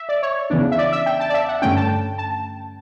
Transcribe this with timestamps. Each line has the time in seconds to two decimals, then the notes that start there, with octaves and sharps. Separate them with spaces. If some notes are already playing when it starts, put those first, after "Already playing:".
Already playing: E5
0.09 D5
0.23 C#5
0.50 E2 C#3 E3 B3 D4
0.72 E5
0.78 D5
0.92 E5
1.06 G5
1.20 A5
1.30 D5
1.34 E5
1.48 F#5
1.62 G2 D3 A3 C#4 G5
1.77 A5
2.18 A5